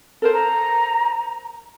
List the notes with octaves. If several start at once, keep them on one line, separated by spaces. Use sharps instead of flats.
A4 A#4 C5
A#5